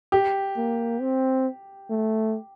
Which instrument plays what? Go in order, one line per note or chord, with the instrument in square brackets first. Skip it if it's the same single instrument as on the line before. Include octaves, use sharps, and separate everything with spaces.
[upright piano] G4
[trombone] A#3
C4
A3